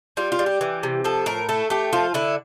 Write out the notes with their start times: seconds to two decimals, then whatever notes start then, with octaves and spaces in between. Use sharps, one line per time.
0.17 G3 F4
0.32 F4
0.39 G3
0.46 G4
0.61 E3
0.83 C3
1.04 F3 A4
1.26 A2 A#4
1.49 A3 A4
1.70 A3 G4
1.93 F3 F4
2.14 D3 E4